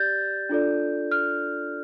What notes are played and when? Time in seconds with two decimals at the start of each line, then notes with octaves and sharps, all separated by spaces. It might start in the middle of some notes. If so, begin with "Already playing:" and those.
Already playing: G4 D5 G6 A6
0.49 D4 F4 A4 D5
1.11 F6